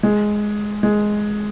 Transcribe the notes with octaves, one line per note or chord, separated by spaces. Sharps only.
G#3
G#3